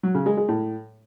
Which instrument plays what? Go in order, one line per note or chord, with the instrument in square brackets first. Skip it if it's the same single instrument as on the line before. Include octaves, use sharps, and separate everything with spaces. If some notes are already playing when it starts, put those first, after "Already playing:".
[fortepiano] F#3
C#3
G#3
G#3
A2